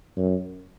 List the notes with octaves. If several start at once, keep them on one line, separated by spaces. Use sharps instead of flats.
F#2